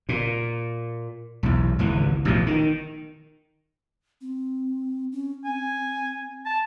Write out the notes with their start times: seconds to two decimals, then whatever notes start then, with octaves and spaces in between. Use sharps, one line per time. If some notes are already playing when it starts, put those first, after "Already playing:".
0.09 A#2
1.43 B1 E2
1.79 G#1 C#2 E3
2.25 A1 B2 F3
2.47 D#3
4.21 C4
5.12 C#4
5.45 C4 G#5
6.46 A5